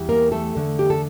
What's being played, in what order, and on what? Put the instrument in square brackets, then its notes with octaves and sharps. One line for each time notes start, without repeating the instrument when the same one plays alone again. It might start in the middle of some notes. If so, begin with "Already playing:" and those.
Already playing: [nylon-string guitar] E2 E3 G3
A#3 A#4
A3 A4
E2 D3 A3
G4
A4